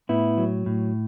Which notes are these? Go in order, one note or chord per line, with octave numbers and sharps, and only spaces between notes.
A2 B3 E4
F#3
A2